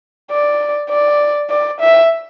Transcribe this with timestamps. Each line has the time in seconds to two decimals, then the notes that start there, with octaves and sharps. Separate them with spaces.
0.31 D5
0.90 D5
1.50 D5
1.81 E5